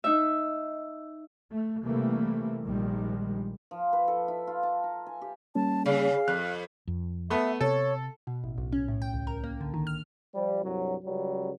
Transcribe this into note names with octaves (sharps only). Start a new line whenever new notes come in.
D#4 E5
A3
C3 E3 G3 A3 A#3
A#1 D#3 F3 G3 G#3
F3
B4
A4
E4
F4
A5
A#5
G#5
G4
G3 A#3 C#4 A5
C#3 G#4 F5
F2 F#6
F2
A3 B3 E5
C3 A4 C#5
B2
A1
B1
C#4
A2
G5
C#2
A#4
A#3
D3
D#3
F6
F3 G3
C2 G2 F#3
C#2 C#3 F#3 G3